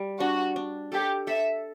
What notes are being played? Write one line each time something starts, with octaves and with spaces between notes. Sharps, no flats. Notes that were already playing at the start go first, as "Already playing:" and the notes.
Already playing: G3
D4 F#4
D4
G4 A4
A4 E5